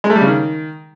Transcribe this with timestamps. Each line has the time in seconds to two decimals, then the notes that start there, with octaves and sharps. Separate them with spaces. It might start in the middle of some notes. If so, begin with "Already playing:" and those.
0.04 G#3
0.10 A3
0.16 G3
0.21 C#3
0.27 D#3